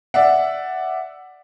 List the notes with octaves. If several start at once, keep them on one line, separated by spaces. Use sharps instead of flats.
D5 E5 F#5